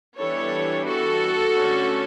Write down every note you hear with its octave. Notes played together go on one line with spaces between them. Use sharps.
E3 G3 B3 D4 A4 C#5
F#4 A4
D3 A3 C#4